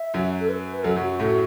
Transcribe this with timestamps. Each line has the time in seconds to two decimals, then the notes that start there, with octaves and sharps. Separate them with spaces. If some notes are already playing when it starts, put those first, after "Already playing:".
Already playing: E5
0.14 F#2 F#3
0.40 A4
0.49 B4
0.77 B4
0.84 F#2 F#3 A4
0.96 F#2 F#3 F#4
1.08 F#4
1.19 A2 A3 F#4